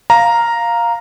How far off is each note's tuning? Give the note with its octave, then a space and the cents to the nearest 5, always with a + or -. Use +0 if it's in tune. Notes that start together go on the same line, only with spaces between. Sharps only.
F5 +0 A#5 +0